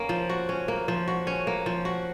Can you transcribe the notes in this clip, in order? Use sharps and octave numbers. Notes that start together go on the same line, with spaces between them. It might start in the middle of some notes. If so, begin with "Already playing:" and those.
Already playing: A#3 C#4
F3
F#4
C#4
A#3
F3
F#4
C#4
A#3
F3
F#4